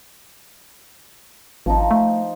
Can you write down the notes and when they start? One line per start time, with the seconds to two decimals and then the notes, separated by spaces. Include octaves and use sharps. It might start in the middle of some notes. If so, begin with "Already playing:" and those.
1.66 G#1 F3 D#4
1.91 A3